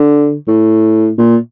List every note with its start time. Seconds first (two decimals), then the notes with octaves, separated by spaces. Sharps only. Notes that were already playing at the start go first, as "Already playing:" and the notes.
Already playing: D3
0.48 A2
1.18 A#2